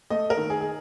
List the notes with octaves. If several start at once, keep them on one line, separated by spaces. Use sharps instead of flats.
A3 D#5
A#4
D#3
G#4
G#4